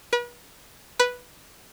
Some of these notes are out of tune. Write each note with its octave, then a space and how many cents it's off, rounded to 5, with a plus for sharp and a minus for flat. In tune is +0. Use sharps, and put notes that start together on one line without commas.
B4 -40
B4 -5